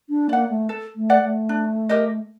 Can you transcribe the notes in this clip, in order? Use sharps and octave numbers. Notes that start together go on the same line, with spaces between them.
D4
A#3 D5 F#5
A3
A4
A3
D5 F#5
A3
D4
G4 A#4 D#5